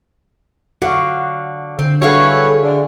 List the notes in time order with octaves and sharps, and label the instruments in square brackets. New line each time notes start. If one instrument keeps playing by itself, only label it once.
[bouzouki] D3 [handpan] F#4 F5
[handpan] D3 [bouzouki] C4
[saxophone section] G2 B4 C#5 [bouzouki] E4 G#4 F5 [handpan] F#4 [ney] A4
[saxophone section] D3